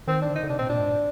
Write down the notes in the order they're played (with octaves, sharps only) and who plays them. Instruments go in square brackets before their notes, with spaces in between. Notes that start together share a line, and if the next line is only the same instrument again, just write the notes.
[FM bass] D#3 [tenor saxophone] C4
[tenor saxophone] D4
[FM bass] D3
[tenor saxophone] D#4
[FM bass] D3
[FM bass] C3 [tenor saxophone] D4
[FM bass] A#2 [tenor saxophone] C4
[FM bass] A#2 [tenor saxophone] D4
[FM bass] G#2